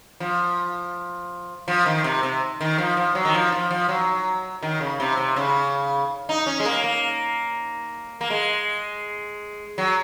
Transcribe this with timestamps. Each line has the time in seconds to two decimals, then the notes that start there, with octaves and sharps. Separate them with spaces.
0.20 F3
1.68 F3
1.86 D#3
2.04 C3
2.23 C3
2.61 D#3
2.78 F3
2.97 F3
3.15 F#3
3.25 D#3
3.34 F3
3.52 F3
3.70 F3
3.88 F#3
4.63 D#3
4.81 C#3
5.00 C3
5.17 C3
5.36 C#3
6.29 D#4
6.46 C#4
6.60 G#3
6.66 A#3
6.84 A#3
8.21 A#3
8.30 G#3
9.78 F#3